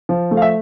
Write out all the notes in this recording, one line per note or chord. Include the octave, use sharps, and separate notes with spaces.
F3
A3
F5
E5